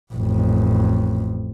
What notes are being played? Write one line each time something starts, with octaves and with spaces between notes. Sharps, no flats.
A1 F2